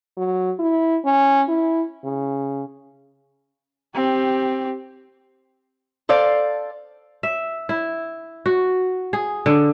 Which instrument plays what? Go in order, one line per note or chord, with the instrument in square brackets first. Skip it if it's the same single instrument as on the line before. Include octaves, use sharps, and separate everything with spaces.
[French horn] F#3
E4
C#4
E4
C#3
[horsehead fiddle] C4 G4
[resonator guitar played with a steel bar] A4 C5 D5 F5
[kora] E5
E4
F#4
G#4
D3